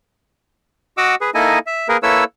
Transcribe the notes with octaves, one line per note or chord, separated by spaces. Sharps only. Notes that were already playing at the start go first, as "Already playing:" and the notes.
F#4 D#5 F#5 D6 E6
G#4 B4
A#3 D#4 E4 A4 D#5 G#5
E5
A#3 G#4 A#4 B4
A#3 E4 A4 B4 C#5 E6